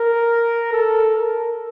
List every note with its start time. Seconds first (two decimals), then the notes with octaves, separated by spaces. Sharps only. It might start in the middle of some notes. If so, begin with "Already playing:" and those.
Already playing: A#4
0.72 A4
1.15 A#4